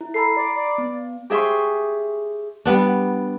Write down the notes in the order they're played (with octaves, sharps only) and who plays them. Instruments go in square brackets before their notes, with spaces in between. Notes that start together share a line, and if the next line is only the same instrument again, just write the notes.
[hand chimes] E4
[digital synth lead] A4 [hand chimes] A#5 B5 C7
[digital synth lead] D5
D5
[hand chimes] B3
[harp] G4 G#4 E5 C6 C#6
[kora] G3 B3 D4